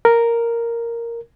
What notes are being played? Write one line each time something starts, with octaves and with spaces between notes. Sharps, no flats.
A#4